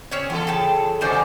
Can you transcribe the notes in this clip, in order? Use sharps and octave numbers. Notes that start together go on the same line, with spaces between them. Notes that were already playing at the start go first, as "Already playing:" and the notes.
C4 C#4 G#4 C#5
E3 B3 A4
C#3 G5 A5
F2 G#2 C3 D#3 C5 D5